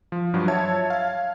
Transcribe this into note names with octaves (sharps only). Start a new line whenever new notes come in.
F3
G2 F3 F#3
C#5 E5 A5 G#6
F5